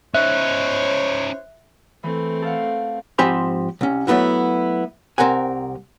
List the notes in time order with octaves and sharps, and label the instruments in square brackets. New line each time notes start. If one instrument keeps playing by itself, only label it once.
[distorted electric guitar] C#4 D#4 [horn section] E4 C5 C#5 [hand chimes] E5 F#6
[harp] E3 [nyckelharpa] A3 C4
[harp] A4 F5 F#5
[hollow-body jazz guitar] G#2 F3 C4 G4 G#5 B5
C2 C#4
F#3 A3 B3 E4 F#4
C2 C4 A#4 F#5 G#5